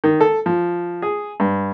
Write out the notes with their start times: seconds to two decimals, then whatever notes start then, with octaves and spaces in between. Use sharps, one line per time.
0.04 D#3
0.21 A4
0.46 F3
1.02 G#4
1.40 G2